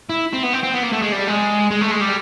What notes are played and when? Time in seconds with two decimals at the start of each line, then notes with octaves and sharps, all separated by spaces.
0.09 E4
0.34 C4
0.43 B3
0.54 C4
0.64 C4
0.74 B3
0.84 A#3
0.93 A3
1.02 G#3
1.12 G3
1.27 G#3
1.71 G#3
1.81 A3
1.91 G#3
2.01 G3